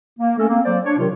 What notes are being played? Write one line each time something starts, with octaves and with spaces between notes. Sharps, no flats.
A#3
A3 C#4 A4 A#4
A#3 C4
F#3 A#3 C5 D5
D4 C#5
C3 D#3 F#3 F4